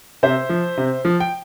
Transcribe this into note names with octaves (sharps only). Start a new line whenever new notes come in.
C3 C5 E5
F3
C3
F3
G5